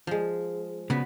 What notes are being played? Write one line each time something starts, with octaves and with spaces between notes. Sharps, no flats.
F3 G#3
C#3 B3 F#4 B5